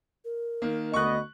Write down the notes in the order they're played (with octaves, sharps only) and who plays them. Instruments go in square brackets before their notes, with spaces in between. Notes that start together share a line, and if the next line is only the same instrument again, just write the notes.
[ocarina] A#4
[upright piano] D#3 A#3
[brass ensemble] D2 B3 D#5 [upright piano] C#6 F#6